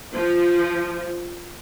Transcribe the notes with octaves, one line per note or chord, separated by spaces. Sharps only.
F3